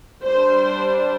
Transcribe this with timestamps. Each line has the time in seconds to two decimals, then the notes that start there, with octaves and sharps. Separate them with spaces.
0.23 G3 D4 C5